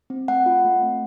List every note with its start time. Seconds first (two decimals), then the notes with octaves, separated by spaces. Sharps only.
0.10 C4
0.28 A3 F#5
0.46 F4
0.64 A3
0.82 C4